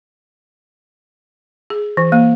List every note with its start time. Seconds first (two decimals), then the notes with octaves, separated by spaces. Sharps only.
1.70 G#4
1.97 E3
2.12 A#3